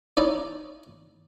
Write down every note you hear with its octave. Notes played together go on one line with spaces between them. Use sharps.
C#4 D#4 E4 D5